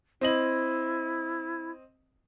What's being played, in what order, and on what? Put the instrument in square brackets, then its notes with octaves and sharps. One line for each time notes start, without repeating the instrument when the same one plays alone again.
[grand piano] C4 D#5 F#7 [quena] E4